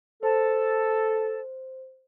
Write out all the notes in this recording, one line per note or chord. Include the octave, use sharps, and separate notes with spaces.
A4 C5